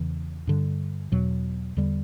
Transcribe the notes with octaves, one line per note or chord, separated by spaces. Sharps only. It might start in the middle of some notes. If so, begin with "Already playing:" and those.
Already playing: E2 C#3 E3
G2 D3 G3
E2 B2 F#3
E2 D3 G3